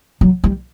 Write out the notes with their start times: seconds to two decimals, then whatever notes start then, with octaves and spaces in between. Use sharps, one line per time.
0.21 F#3
0.44 G3